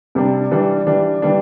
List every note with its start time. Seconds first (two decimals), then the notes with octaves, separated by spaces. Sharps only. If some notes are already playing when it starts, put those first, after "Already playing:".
0.15 C3 G3 D4
0.51 E3 G3 D4
0.87 E3 G3 D4
1.22 E3 G3 D4